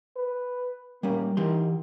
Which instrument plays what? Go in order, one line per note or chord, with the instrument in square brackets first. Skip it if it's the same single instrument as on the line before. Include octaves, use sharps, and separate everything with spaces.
[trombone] B4
[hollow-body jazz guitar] G3 C#4 [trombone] A#3
[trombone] D#3 [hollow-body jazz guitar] E3 G4 C6